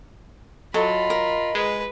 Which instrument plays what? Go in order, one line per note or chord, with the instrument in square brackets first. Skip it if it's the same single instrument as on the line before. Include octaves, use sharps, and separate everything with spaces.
[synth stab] F#3 [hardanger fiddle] F4 B5 [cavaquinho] A4 [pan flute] D#5
[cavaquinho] A#4
[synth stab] G#3 [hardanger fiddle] B4